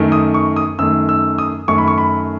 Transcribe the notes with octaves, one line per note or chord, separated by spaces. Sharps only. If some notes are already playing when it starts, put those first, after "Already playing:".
Already playing: F#2 D#3 A3
D#6
C#6
D#6
F#2 D#3 A3 E6
E6
D#6
F#2 D#3 A3 C#6
B5
C#6
B5